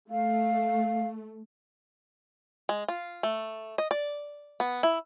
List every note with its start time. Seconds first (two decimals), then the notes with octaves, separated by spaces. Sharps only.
0.11 A3 F5
2.69 G#3
2.88 F4
3.23 A3
3.78 D#5
3.91 D5
4.60 B3
4.83 E4